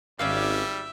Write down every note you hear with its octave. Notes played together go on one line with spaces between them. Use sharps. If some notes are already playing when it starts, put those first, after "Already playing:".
G#1 G3 C#4 D5 E5 F5